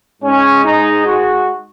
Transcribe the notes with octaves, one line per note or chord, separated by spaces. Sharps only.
G#2 G#3 C#4
D#4
F#4